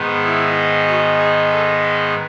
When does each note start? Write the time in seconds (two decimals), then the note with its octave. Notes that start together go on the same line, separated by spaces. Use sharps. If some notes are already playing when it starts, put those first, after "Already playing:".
Already playing: G#2 D#3 G#3 B3
0.23 E4
0.87 F#4
1.18 G#4
1.51 A4
1.83 B4